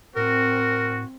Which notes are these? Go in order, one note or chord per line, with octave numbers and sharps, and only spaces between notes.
A2 C4 F#4 A#4